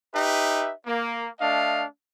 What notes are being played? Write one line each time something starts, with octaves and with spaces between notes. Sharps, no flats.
D#4 G4 B4 E5
A#3
A3 D4 D#5 F5